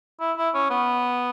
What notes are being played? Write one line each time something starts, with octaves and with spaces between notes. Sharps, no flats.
E4
E4
C#4
B3